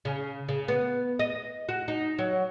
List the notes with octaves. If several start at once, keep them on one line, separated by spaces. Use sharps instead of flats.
C#3
C#3
B3
D#5
F#4
D#4
F#3